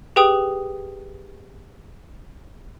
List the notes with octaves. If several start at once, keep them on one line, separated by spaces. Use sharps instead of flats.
G4 G#4 B4 G5 D#6